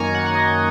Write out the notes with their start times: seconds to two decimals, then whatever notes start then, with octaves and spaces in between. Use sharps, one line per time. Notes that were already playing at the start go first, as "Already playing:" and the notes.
Already playing: F#2 D#3 A#3 G#5 A#5 C#6
0.15 F#5
0.26 F#5
0.35 D#5